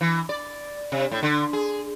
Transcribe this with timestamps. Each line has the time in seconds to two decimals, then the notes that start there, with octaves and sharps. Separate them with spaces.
0.01 E3
0.29 D5
0.92 C3
1.12 A2
1.23 D3
1.53 G#4